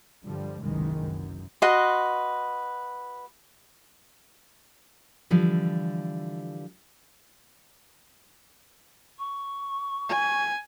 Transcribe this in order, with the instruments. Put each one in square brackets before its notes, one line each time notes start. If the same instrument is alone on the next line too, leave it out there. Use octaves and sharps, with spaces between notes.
[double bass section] G2 D3 F3 G3
F#1 C2 F#2 D#3 E3 G#3
F#2
[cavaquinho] F#4 B4 D#5 C6
[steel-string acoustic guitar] D3 E3 F3 G3
[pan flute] C#6
[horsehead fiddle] G#5